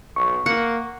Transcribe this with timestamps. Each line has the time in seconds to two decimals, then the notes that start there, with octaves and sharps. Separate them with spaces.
0.16 B1 C#6
0.46 A#3 F#5